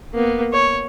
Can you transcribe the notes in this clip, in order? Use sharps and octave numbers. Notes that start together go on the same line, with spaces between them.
A#3 B3
C#5